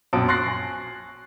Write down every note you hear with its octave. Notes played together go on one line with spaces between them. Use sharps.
A#1 F#2 B2 A5 D#6 D7
C6 C#6 F#6 A6 A#6 C7
G#5